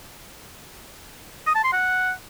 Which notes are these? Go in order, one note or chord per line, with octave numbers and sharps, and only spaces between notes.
D#6
A5
C6
F#5